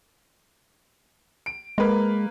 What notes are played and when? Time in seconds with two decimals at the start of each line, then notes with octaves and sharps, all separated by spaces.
1.46 D7
1.78 G#3 A#3 A#4 B4